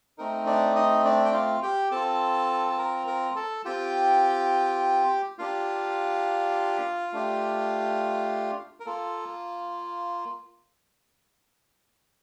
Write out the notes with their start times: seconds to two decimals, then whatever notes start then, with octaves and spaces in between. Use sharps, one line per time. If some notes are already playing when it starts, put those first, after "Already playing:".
0.18 A3 C4 D#4 A#4
0.47 D4 D5
0.76 D#4 D#5
1.04 D4 D5
1.25 G5
1.34 F4 F5
1.62 G4 G5
1.91 C4 F4 A4 A5
2.71 A5
2.78 A#4 A#5
3.07 A#4 A#5
3.36 A4 A5
3.65 C4 F4 G4 G5
5.38 A#3 D4 F4 G4 F5
7.12 A3 D4 G4
8.80 A#4
8.86 A#3 F4 A4